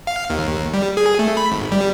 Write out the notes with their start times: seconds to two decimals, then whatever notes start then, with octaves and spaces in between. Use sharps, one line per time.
0.07 F5
0.30 D#2
0.73 G3
0.97 G#4
1.19 A3
1.37 B5
1.52 G#1
1.72 G3